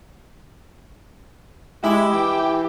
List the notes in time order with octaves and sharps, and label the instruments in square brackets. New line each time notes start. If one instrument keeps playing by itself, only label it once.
[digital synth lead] G#3 [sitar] E4 [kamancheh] G4
[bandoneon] E3 [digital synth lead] G5